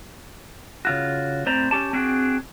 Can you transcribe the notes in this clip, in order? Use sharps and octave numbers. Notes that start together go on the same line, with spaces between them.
C#3 F4 F#4
A2 C4 C5 D5 A#5
C#4 G4 A5
C4 D4 F#4 G#4 G5